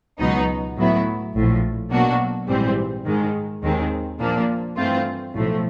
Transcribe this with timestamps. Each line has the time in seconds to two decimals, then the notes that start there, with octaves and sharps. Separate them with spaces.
0.19 C#2 B2 F#3 B3 D#4
0.76 A2 F#3 B3 E4
1.33 A#1 A2 F3
1.91 B2 F#3 A#3 D4 F#4
2.47 A#1 G#2 E3 G3 C4
3.05 G#2 D#3 G#3
3.62 D#2 D#3 G#3 C4
4.19 A#2 F3 A#3 D4
4.76 G2 E3 A3 C4 F4
5.33 B1 A2 F3 A3